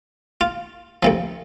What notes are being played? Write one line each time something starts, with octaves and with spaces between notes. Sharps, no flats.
F4
D2 C3 F3